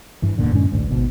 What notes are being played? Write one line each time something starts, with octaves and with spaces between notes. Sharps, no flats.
G2 E3
D#1 A#1 A#2 D3
F#2 A2 G#3 C#4
A1 D2
G#1 G#2 B2